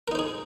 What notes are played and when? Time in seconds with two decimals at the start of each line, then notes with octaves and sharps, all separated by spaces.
0.08 A#4
0.11 D#4
0.15 C5
0.19 G#4